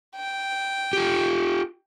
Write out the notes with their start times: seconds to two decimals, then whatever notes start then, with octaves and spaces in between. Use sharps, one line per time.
0.16 G5
0.93 F4 G4